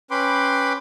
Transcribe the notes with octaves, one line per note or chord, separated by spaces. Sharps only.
C#4 B4 G5 B5 C6 D6